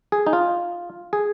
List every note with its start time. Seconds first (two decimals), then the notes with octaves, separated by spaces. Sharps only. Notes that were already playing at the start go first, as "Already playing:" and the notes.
0.12 G#4
0.27 D#4
0.33 F4
1.13 G#4